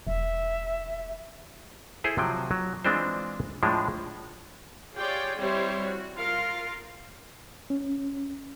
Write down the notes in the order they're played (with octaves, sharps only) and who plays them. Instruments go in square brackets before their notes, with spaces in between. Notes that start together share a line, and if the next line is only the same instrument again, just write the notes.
[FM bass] E1 [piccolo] E5
[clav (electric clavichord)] E4 G#4 A4 C5
C3 F3 F#3 G5
F#3
E3 G#3 C4 D4 F4 C5
A2 F3 G#3 D4
[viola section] F4 G4 G#4 C#5 D5 G5
G3 C4 E4 G4 C5 C#5
F#4
F4 A#4 F5
[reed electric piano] C#4